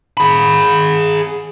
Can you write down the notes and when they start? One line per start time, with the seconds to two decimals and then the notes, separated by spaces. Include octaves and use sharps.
0.17 G#4 B5